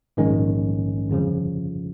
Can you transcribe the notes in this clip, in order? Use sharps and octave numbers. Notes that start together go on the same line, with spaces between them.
A#1 G#2 D#3 G#3 C#4
G1 F2 C#3 F3